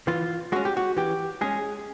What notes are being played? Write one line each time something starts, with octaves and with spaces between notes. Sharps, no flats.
E3 F4
G#3 C#4 F#4
G4
F#4
E3 G4
G#3 C#4 G#4